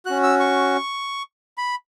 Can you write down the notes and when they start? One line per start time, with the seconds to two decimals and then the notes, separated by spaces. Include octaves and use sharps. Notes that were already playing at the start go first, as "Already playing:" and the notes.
0.06 C#4 F#4 F#6
0.23 E6
0.40 C#6
1.58 B5